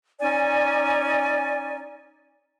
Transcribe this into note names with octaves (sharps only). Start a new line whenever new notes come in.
C#4 D#4 D5 G#5